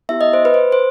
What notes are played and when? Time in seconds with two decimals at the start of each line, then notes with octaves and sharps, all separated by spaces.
0.09 B3 E4 G4 E5
0.21 D#5
0.33 C5
0.45 B4
0.54 C5
0.72 C5